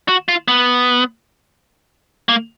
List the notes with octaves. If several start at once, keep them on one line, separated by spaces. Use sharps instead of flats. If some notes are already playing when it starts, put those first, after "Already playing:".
F#4
F4
B3
A#3